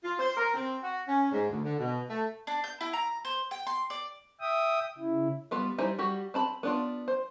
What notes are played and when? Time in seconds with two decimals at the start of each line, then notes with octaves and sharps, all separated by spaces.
0.04 F4
0.19 C5
0.37 A#4
0.54 C4
0.83 F#4
1.07 C#4
1.32 G#2
1.50 D2
1.63 D3
1.79 B2
2.08 A3
2.47 D4
2.64 G6
2.81 E4
2.93 A#5
3.25 C5
3.51 G5
3.67 C6
3.90 D5
4.41 E5 G5 D#6
4.98 C#3 E4
5.51 G3 B3 F4
5.78 G3 D#4 E4 C5 G#5
5.98 G3 F#4 G4
6.34 C4 A5 B5
6.63 B3 D4 F4
7.08 C5